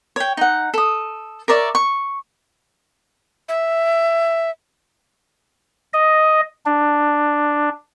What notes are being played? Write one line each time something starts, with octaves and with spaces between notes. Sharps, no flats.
C#5 G5
D#4 F#5
A4 D#6
A#4 C#5 D5 E5
C#6
E5
D#5
D4